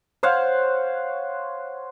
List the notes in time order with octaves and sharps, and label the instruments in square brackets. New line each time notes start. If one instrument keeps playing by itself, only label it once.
[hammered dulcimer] C5 C#5 F5 F#5